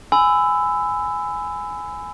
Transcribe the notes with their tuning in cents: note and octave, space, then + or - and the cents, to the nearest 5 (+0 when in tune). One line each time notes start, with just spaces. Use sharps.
G#5 +0 B5 +30 E6 +0